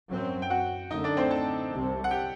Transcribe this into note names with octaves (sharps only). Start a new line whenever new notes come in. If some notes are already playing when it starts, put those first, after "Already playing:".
F#2 F#3 C4
G5
F#4 F#5
F#2 D3 A3 D#4 D#5
D4 D5
C4 C5
A4 A5
C2 C3 G3 C4
F#5
G4 G5